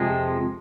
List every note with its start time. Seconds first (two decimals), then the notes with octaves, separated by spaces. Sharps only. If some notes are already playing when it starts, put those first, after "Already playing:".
Already playing: F2 C3 F3 G#3